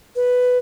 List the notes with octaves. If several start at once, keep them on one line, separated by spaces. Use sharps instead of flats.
B4